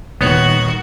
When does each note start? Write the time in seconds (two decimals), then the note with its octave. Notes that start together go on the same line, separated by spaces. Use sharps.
0.21 D#1 D#3 B3 F#4 C#5